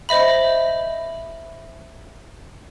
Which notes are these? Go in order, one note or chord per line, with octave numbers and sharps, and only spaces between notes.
C5 D#5 E5 B5